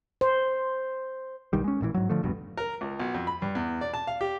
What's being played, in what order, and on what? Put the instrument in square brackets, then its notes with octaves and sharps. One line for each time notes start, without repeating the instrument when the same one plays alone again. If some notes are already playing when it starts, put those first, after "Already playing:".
[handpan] C5
[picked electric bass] B1 D#3 G3
G#3 C#4
A1 A#2 D3 E3
G#2 F#3
D3 F3 A3
F1 C2 G2 B2
[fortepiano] A#4
C#2
B1
F2
B5
G2
E2
D5
A5
F5
G4